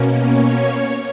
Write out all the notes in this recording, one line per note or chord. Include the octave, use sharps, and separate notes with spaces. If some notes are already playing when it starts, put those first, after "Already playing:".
Already playing: B2 A#3 C#4
C#5